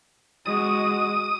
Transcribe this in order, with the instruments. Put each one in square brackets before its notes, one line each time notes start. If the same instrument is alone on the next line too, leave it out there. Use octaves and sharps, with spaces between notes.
[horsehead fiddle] G#3 F#4 [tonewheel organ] D#6